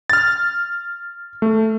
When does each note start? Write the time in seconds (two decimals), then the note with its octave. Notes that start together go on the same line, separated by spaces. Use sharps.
0.10 F6 A6
1.42 A3